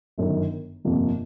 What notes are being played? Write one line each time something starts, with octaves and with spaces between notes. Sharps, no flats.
G1 F#2 D#3
G1 F2 C3 F3 A#3